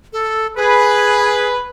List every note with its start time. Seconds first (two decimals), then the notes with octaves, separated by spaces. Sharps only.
0.13 A4
0.56 G#4 B4